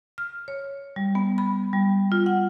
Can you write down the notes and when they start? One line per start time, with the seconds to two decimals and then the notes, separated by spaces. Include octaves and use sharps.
0.18 F6
0.48 C#5
0.96 G3
1.15 B3
1.38 B5
1.73 G3
2.12 F4
2.26 F#5